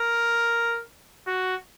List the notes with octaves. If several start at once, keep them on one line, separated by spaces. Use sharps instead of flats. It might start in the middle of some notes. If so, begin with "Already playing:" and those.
Already playing: A#4
F#4